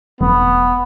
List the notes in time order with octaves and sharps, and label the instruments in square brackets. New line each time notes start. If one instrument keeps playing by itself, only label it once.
[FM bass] E1 [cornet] B3